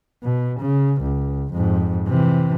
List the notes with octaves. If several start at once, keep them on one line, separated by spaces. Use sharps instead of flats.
B2
C#3
C#2
F2 G#2
C3 E3